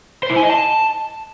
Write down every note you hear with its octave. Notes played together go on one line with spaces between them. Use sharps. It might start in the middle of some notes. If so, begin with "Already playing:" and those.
C5
E4
G#5
D#5
A5